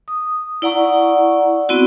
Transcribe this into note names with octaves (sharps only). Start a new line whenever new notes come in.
D#6
E4 D5 F#5 A#5 C#6
B3 C4 E4 F#4